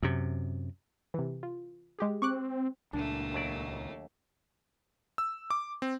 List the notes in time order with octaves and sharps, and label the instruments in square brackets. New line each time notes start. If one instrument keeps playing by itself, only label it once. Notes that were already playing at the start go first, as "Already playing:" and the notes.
[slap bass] F#2 C3
[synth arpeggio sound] C3 E3
F4
G#3 G4 G#4
[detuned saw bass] C4 [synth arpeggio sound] C#6 D6 F#6
[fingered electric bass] C#2 A#2 [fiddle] A3 A#3 [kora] D4
[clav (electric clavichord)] D#2 F#3 D5
[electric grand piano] E6
D6
C4